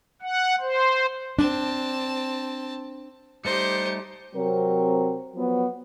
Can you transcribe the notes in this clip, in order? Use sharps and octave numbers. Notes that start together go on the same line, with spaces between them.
F#5
C5
C4 D4 A5
G3 A3 D#4 G4 C5 C#7
C3 F#3 C4 A#4
F3 F#3 B3